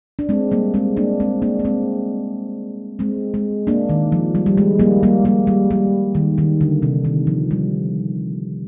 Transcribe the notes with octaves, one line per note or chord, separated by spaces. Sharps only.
D4
G#3 C4
G3 A#3
G#3 C4
A#3 D4
G#3 C4
A#3 D4
A#3
G#3 C4
G#3 C4
G#3
A#3 D4
D#3
F3
G3
G3
G#3
G3 A#3
G3 A#3
G3 A#3
G3
G3
D#3
D#3
D3
C3
D#3
F3
G3